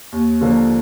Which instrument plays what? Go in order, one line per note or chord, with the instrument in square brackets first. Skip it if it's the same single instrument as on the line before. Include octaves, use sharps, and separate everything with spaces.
[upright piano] D#2
D3 F3 A#3